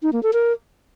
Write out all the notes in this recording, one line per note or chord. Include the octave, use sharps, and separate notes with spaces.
D#4
A#3
A4
A#4